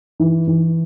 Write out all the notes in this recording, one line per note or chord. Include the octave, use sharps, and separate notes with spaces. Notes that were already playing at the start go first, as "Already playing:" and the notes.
E3
E3